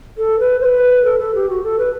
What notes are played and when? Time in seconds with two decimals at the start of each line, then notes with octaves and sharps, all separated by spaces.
0.17 A4
0.39 B4
0.61 C5
0.65 B4
1.05 A4
1.19 A4
1.35 G4
1.50 F#4
1.63 A4
1.79 B4